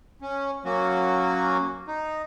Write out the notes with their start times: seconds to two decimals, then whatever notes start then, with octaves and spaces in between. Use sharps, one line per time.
0.22 C#4
0.65 F#3 A#3 C#4 F#4
1.88 D#4